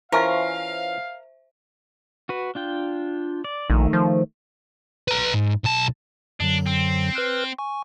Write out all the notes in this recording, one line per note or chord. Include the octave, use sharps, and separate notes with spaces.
E3 C#4 F4 A#4 C5 E5 F5
F#4 B4
D4 F4 G5
D5
A#1 D#3 A3
F3
B4 A#5
G#2
B1 A5
F#2 D3 F#3 D4
C4
B4 F6 F#6
G#5 C#6